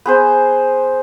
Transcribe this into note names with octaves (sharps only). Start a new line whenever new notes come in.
B3 G#4 C5